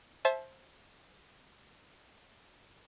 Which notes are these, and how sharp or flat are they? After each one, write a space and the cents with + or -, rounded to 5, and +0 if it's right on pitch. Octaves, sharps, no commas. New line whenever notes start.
C5 +20 E5 +0 A5 -30